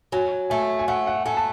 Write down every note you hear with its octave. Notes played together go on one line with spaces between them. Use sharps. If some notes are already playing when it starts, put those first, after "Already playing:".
F#3 G#5
A3 G#5
G#5
A3 F#5
F#5
A3 G#5
A5